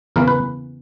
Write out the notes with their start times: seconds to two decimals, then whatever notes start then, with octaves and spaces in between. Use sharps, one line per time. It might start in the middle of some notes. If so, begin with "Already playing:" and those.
0.16 E2 C#3 E3 A#3 A#4
0.28 B4